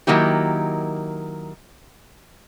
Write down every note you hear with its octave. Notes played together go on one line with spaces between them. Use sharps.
D#3 F#3 A#3 E4 G4